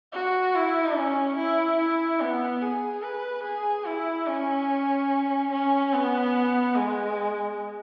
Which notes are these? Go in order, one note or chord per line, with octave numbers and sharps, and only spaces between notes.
F#4
E4
C#4
E4
E4
B3
G#4
B4
G#4
E4
C#4
C#4
B3
G#3